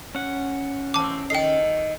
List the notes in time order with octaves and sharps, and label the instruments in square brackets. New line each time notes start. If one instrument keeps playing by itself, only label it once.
[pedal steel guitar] C#4 F#5
[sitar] E3 A3 C4 [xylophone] A5 D6
[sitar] D#3 A4 D#5 [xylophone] G5 C7